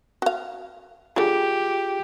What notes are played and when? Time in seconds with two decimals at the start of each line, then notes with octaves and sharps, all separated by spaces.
0.22 F#4 F5
1.16 D3 G3 F4 G4 G#4